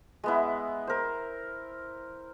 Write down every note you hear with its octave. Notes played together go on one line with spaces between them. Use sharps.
G#3 B3 E4
A#4 C5